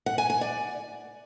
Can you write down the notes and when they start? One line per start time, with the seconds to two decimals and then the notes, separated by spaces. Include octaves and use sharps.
0.06 F#5
0.18 G#5
0.30 G#5
0.41 D5